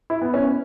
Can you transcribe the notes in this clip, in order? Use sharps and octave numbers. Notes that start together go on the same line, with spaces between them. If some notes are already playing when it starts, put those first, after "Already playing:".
E4
B3
C#4